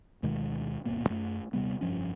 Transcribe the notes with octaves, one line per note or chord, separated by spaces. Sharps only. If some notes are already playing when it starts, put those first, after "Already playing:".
D2 B2 D#3 G#3
D#1 G#1 B2 A#3
F#2 A3
D#1 C3 G3 B3
F1 G2 F3 C#4